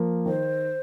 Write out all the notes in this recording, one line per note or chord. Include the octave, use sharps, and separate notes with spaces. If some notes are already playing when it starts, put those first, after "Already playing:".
Already playing: F3 A#3
D#3 C5